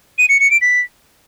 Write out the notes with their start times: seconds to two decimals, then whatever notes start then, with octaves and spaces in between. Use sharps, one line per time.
0.18 D#7
0.29 C#7
0.39 C#7
0.50 D7
0.61 B6